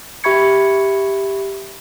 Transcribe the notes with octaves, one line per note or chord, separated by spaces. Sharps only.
G4 E5 B5 C#6 G#6 C#7